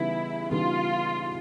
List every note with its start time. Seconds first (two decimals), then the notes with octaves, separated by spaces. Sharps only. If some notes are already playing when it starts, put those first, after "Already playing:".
Already playing: C#3 E3 G3 B3 D#4 E4
0.51 C#3 E3 G3 B3 D#4 F4